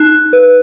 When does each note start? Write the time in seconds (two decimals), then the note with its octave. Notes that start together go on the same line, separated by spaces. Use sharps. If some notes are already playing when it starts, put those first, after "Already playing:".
Already playing: D#4 F#6
0.33 B4